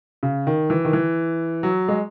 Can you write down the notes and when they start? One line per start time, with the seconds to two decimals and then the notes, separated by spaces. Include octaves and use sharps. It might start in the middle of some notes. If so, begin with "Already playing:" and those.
0.23 C#3
0.47 D#3
0.70 E3
0.85 D#3
0.93 E3
1.63 F#3
1.88 G#3